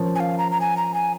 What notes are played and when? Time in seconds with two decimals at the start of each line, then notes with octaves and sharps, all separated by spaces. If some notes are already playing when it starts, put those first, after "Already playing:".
Already playing: F3 C#4 A#4 C#5
0.15 G#5
0.20 F5
0.38 A#5
0.51 A#5
0.60 G#5
0.77 A#5
0.94 G#5